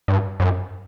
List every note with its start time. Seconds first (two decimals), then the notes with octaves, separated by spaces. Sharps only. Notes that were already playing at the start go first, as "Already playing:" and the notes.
0.08 G2
0.40 F#2